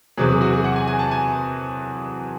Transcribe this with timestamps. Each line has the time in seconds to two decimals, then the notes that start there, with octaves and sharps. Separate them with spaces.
0.17 E2 C3 F#3 G#4
0.29 G#4
0.41 F#4
0.53 G#4
0.64 F#5
0.76 G#5
0.87 G#5
0.99 A5
1.11 G#5